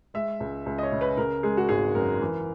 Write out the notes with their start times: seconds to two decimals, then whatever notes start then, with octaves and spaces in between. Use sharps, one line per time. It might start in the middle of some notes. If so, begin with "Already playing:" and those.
0.14 G#3 E5
0.40 C#2
0.66 C#2
0.78 D#5
0.83 C#5
0.92 C#3
1.01 B4
1.17 C#3 A#4
1.43 G#3 G#4
1.57 F#4
1.69 G#1 G#4
1.95 F#2 A#4
2.21 E3